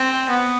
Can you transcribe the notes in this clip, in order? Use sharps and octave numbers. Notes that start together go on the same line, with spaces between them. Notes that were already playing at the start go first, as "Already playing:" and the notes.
Already playing: C4
B3